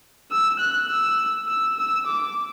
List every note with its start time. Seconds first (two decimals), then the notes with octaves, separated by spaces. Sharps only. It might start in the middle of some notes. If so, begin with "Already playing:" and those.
0.32 E6
0.60 F#6
0.89 E6
1.48 E6
1.77 E6
2.06 D6